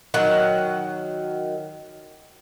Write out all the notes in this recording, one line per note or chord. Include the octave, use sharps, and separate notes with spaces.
D#3 F#3 F#5